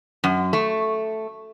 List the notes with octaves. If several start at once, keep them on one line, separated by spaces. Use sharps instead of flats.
F#2
A3